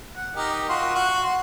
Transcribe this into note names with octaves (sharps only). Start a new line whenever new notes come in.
F#5
D#4 G4 A#4
F4 F#4 C6
F#4
C6